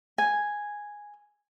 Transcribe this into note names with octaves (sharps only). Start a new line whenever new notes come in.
G#5